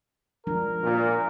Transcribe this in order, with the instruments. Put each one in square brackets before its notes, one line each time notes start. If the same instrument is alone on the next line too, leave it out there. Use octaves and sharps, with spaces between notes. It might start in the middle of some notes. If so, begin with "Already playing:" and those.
[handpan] F3 G#3 D4 [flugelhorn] A#4
[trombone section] A#2